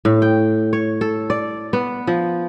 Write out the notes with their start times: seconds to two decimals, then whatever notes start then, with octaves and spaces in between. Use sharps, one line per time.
0.05 A2
0.22 G5
0.73 C#5
1.01 A4
1.30 D5
1.73 B3
2.07 F3